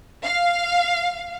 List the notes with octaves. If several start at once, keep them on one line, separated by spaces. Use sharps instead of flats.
F5